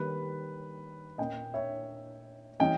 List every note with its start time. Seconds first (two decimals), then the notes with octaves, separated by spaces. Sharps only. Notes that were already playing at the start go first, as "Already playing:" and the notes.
Already playing: D#3 G3 A#3 B4
1.18 A#2 A#3 C#4 D#5 G5
1.54 C#5 E5
2.60 E3 G3 C#4 D#5 G5